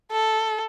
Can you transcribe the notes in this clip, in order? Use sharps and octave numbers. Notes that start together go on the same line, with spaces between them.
A4